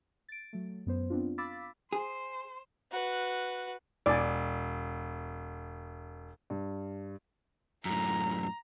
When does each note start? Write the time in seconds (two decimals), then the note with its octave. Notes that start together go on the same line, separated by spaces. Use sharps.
0.29 A6 D7
0.53 F#3 A3
0.86 F#2 B3 C5
1.10 B3 C4 D4 F4
1.38 F5 B5 D6 E6 A6 B6
1.93 G#4 C5
2.92 F#4 B4
4.06 E1 D5 G#5
6.50 G2
7.85 F#2 A2 A#5